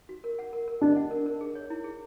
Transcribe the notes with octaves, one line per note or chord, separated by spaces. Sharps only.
F#4
A#4
F#5
A#4
A#4
D4 D#5
F#5
A#4
A#4
G#4
C#5
E4
G#4